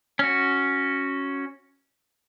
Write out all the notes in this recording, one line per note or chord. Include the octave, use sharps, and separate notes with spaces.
C#4 F#4